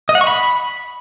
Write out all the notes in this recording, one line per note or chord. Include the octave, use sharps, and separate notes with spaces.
D#5
F#5
C#6
B5